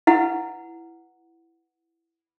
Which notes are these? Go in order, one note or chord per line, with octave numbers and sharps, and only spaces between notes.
E4 B4 F#5